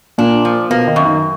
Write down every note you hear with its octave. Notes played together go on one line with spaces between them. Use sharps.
A#2 A#3 D4
F3
B2 A#3 B3
D#3 D#4
F#2
D#3 D#4